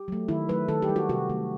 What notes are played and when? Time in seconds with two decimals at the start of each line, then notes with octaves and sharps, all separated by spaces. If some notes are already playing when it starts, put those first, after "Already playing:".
Already playing: G4
0.08 F#3 A3
0.29 D#3 E4
0.49 F#3 A3 B4
0.68 D#3 A4
0.82 G4
0.89 G3
0.96 F#4
1.09 C3 F#4
1.29 D#3 F#3 A3